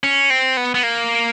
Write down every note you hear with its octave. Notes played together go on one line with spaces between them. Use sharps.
C#4
C4
B3
B3
A#3